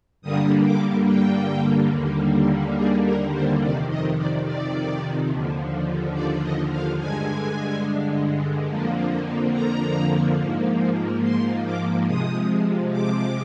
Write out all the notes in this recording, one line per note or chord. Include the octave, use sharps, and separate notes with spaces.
G2 D3 G3 A#3 D#6
D6
G5
D#2 D3 G3 A#3
G#4
A#4
C5
F2 C3 D#3 D5
D#5
D5
D5
D#2 D3 F3
D5
D#5
F5
G2 D3 G#3 G#5
F2 D3 F3 A#3
A#5
G#2 F3 A#3
C6
D6
C3 F3 G#3 D#6
D6